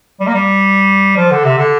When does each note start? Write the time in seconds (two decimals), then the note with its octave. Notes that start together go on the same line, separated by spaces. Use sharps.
0.20 G3
0.27 A#3
0.34 G3
1.17 F3
1.31 D3
1.44 C3
1.58 D3